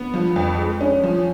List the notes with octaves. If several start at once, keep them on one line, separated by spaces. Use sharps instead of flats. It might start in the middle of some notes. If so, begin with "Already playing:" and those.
Already playing: B3
F3
F2
G#3
C#4
F3